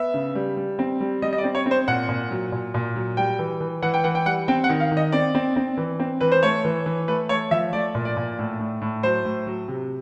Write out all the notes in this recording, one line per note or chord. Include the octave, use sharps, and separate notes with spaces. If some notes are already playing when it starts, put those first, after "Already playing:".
Already playing: B3 E5
C#3
G3
G3
C4
G3
G3 D#5
D#5
D5
C4
C#5
C4
C5
A#2 F#5
A#2
F#3
A#2
A#2
F#3
G3 G5
E3
E3
E3 F#5
G5
E3 F#5
G5
G3 F#5
C4 G5
F#5
D#3
F5
D#3
D#5
C4 D5
C4
C4
E3
C4
E3 B4
C5
A3 C#5
E3
E3
A3 B4
A3 C#5
F3 E5
A3 D5
A#2
D5
A#2
A2
A2
A2
F#3 C5
A2
F#3
C3